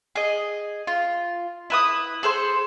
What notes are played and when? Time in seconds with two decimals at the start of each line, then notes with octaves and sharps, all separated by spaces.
0.16 G#4 D#5
0.87 F4
1.70 E4 B4 D#6
2.23 G#4 A4 C5 C6